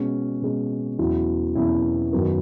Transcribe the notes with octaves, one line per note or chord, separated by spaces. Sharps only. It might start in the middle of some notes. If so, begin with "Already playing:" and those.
Already playing: B2 G#3 C#4
B2 G#3 C#4
E2 B2 F#3 C#4 E4
E2 B2 F#3 C#4 E4
F#2 D#3 F#3 B3